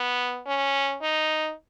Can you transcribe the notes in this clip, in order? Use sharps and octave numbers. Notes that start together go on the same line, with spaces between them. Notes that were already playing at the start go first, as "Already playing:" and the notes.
Already playing: B3
C#4
D#4